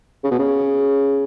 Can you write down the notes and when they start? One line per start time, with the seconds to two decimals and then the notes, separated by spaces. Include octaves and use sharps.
0.24 C#3
0.31 B2
0.39 C#3